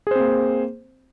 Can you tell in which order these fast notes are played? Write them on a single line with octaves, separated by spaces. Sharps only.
G#4 C5 C4 A#3